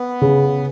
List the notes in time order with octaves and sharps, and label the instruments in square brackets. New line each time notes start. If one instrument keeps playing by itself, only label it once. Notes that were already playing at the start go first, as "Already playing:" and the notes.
Already playing: [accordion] B3
[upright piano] C#3